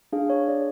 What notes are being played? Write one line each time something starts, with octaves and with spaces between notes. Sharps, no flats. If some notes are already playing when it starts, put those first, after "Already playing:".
D4 G#4 F5
C#5
D4 G#4 D5